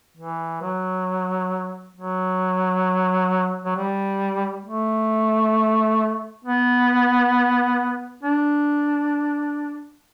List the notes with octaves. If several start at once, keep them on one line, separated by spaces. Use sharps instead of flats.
E3
F#3
F#3
F#3
G3
A3
B3
D4